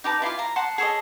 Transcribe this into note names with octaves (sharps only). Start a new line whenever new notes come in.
D#4 G4 B4 A5
E4 F4 G4 F5
A#5
F#5 A5 C6
G#4 A4 C#5 D#5